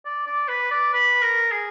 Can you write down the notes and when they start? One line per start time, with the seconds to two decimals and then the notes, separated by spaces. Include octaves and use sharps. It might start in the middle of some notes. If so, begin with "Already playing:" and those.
0.06 D5
0.27 D5
0.48 B4
0.71 D5
0.93 B4
1.22 A#4
1.52 G#4